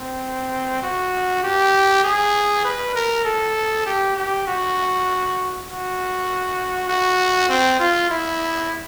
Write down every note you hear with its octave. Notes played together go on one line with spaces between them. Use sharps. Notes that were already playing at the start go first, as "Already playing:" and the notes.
Already playing: C4
F#4
G4
G#4
B4
A#4
A4
G4
G4
F#4
F#4
F#4
C4
F4
E4